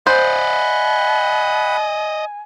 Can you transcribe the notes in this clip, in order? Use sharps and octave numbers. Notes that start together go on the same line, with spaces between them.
C5 D5 D#5 F#5 G#5 B5